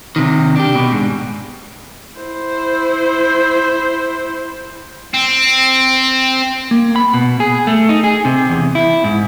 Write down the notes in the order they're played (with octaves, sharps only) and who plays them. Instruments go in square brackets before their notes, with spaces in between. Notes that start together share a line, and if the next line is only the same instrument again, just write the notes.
[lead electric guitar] C3 D#3
D4 G4
B2
G#2
[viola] E4 C5
[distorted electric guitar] C4
[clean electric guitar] A#3
B5
B2
G#4
A3
D#4
G#4
C3
E2
E4
G#2